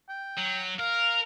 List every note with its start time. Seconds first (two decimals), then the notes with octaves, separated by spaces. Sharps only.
0.09 G5
0.37 F#3
0.79 A#4 F5